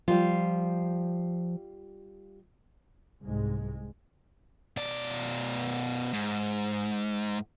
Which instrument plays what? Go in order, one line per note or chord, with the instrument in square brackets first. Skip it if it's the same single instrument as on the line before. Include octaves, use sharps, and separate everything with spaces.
[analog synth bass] F3 [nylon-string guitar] G3 F4
[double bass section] C2 G#2 G#3
[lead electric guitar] B2 D5
G#2